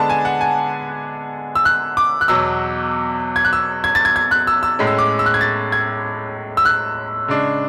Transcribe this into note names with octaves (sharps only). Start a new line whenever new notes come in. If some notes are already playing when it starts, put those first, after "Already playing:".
Already playing: D3 G#3 B3 D4 A5
G#5
F#5
G#5
E6
F#6
D6
F#6
E2 B2 F#3 E6
G#6
F#6
E6
G#6
A6
G#6
G#6
F#6
E6
E6
A2 G#3 C#4
E6
D6
E6
F#6
G#6
A6
G#6
E6
F#6
C#3 G#3 D4